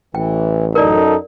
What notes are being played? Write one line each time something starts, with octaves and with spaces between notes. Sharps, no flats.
A1 E3 G5
F#2 D#4 A4 A#4 D5